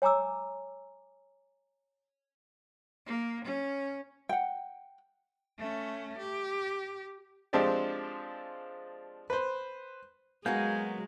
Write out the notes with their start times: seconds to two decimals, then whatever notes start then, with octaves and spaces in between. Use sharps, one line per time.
0.02 C#5 G#5 A#5 D6 E6
3.06 A#3
3.44 C#4
4.29 F#5 G5
5.58 A3 C#4
6.18 G4
7.53 F3 G#3 C4 D4 G4 D5
9.30 B4 C5
10.46 F#3 G#3 A#3 B3 F#4 F5 G#5 G6